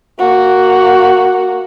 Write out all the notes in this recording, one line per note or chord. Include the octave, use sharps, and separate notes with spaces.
A#3 F#4